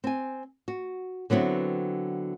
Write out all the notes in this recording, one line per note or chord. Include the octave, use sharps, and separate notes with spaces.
C4 G#5
F#4
D3 F#3 B3 C4 E4